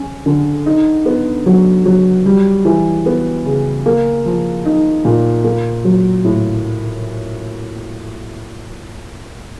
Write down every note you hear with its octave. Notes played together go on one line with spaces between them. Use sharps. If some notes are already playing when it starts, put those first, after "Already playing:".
Already playing: C#4
D3
D#4
B3
F#3
F#3
G3
E3
B3
C#3
A#3
F3
D#4
A#2
A#3
F#3
A2